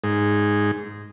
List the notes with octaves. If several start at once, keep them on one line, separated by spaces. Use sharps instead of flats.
G#2